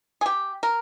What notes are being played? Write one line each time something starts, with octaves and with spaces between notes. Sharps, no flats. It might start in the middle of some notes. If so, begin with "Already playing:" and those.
G#4
G4
A#4